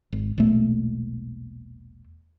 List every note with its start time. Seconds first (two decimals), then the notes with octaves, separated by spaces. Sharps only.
0.12 G#1
0.38 E1 B1 A#2 A3